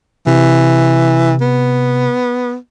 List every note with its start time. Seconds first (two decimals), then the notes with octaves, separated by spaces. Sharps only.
0.27 C3 E3
1.41 B3